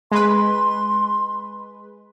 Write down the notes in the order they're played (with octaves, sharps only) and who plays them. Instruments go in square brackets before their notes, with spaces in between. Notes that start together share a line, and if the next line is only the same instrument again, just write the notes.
[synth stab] G#3 B4 [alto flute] C6